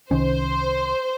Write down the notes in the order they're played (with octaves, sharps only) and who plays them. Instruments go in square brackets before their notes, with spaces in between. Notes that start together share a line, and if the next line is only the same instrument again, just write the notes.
[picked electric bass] C2 D#3 C#4 [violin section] C5